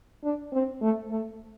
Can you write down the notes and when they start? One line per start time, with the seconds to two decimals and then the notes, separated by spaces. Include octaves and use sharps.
0.24 D4
0.53 C4
0.82 A3
1.11 A3